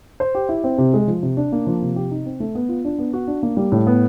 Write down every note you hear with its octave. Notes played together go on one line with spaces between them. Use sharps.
C5
G4
E4
C4
C3
G#3
F3
C3
D4
A#3
F3
C3
G4
D#4
C4
A3
B3
F4
D4
B3
F#4
D4
A#3
G3
A2
B3